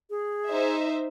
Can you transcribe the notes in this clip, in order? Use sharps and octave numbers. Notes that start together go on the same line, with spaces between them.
G#4
D#4 C5 E5